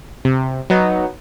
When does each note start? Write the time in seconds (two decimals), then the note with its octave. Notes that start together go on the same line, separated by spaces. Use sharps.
0.25 C3
0.70 F#3 B3 D#4